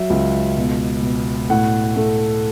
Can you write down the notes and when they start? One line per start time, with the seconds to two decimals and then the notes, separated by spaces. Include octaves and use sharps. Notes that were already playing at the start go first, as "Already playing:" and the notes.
Already playing: F#3 E5
0.10 C#2
0.57 B2
1.03 B2
1.50 A2 F#5
1.96 A3